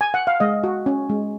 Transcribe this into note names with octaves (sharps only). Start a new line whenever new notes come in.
G#5
F#5
F5
G#3 D#5
F#4
C#4
G#3